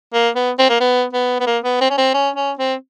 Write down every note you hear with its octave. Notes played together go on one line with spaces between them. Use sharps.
A#3
B3
C4
A#3
B3
B3
B3
A#3
B3
C4
C#4
C4
C#4
C#4
C4